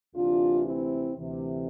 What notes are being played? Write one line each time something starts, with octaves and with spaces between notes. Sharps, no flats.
D2 C3 E3 D4 F4
C4 E4
D2 C3 E3